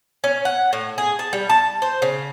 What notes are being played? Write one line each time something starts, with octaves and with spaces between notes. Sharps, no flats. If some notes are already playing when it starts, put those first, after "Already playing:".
C#4
F#5
A2
G#4
A5
G3
A5
C5
C#3